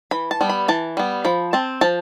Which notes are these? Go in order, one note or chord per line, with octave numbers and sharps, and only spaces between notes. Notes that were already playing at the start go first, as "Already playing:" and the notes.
E3 B5
A5
G3 B3
B5
E3 A5
G3 B3
F3 B5
C4 A5
F3 A5